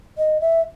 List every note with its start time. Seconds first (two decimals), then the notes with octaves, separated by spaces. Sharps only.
0.18 D#5
0.41 E5